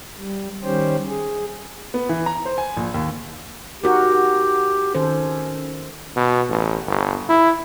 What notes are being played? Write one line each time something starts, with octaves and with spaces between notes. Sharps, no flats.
G3
D#3 G3 C#4 G4 C5
G#4
B3
E3
A#5
C5
G#5
A#1
D#2
D#4 F#4 G4 A#4
D#3 C#4 A4 C5
B2
A1
G1
E4